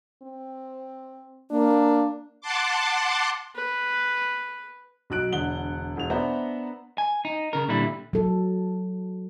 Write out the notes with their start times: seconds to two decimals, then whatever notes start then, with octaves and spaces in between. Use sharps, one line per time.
0.23 C4
1.51 A#3 D4
2.41 F#5 A5 C6 D6
3.56 B4
5.10 B1 F#3 F#6 D7
5.33 E1 D3 F#5 G7
5.97 E1 F7
6.10 B3 D4 C5 E5 F#5 A#5
6.98 G#5
7.25 D#4
7.53 C#3 A#4
7.68 A#2 D3 G3 E4
8.13 F#3 A4